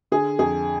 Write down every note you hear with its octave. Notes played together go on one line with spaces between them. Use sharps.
D3 G#4
F2 G#4